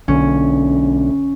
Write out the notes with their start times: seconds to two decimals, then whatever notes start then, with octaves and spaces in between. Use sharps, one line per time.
0.08 B1 D3 C#4